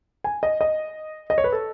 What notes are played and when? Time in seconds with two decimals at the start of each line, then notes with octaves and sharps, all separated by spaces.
0.24 G#5
0.43 D#5
0.61 D#5
1.30 D#5
1.38 C#5
1.44 B4
1.52 A4